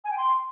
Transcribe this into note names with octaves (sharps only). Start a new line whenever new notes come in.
G#5
G5
C6